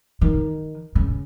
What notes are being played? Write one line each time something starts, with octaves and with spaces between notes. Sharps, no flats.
D#3
C#3